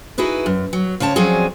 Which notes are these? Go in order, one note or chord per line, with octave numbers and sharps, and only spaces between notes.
D#4 E4 F#4 G#4 B4
F#2
F#3
C#3 C4 C#5 A5
F3 F#3 C4 C#4 G#4 D5